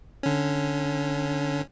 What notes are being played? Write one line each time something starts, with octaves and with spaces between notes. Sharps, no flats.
D3 C#4